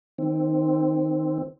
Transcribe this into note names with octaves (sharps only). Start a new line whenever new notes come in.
D#3 C4